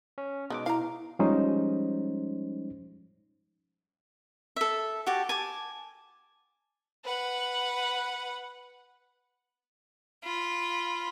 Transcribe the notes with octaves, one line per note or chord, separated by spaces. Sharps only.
C#4
B2 G#3 D#4 D6
E4 F5 A#5
F3 G3 G#3 C#4 D#4 C5
A4 E5
F#4 G4 A5
G#5 A5 D6
B4 F#5
F4 B5